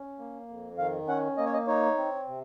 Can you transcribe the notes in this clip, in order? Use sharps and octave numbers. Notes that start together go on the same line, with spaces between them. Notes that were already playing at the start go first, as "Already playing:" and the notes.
Already playing: C#4
A#3
F2
D#3 F5
C#4 F#5
A#3 D#5
C#5
D#5
D#4 C#5
C4
C3